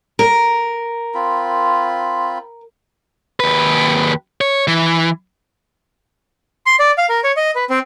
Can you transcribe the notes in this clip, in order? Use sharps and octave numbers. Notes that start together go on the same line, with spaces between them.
A#4
C4 F4 B5
D#2 B4
C#5
E3
C6
D5
F5
A#4
C#5
D#5
B4
C4